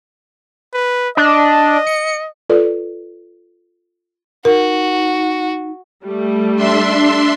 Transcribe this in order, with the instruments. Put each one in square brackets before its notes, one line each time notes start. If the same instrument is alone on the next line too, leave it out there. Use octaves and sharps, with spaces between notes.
[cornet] B4
[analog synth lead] D4 [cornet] D#5
[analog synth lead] C#7
[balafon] F4 A4 B4 D5
[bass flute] D#4 [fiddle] F#4 [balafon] A#4
[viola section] G3 A3
[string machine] D4 E5 C6